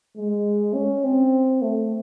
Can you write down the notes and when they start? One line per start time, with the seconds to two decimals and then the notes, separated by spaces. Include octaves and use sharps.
0.17 G#3
0.74 C#4
1.04 C4
1.62 A3